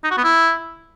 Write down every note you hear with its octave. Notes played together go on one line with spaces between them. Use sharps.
D#4
F#4
B3
E4